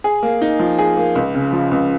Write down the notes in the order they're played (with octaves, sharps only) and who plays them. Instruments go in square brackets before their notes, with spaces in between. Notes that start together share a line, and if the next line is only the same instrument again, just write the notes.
[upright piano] G#4
A#3
D#4
F3
G#4
A#3
C#2
C#3
F3
C#2